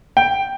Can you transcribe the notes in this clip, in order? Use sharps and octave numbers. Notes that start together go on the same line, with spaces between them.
G5